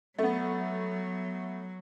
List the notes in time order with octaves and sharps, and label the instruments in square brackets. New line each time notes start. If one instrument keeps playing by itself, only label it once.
[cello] F#3 [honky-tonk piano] A3 B3